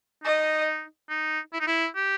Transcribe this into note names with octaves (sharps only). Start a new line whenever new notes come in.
D#4 D#5
D#4
E4
D#4
E4
G4